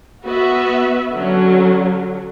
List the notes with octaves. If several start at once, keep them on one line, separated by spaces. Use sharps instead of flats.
B3 F#4 B4 E5
D3 F#3 C#4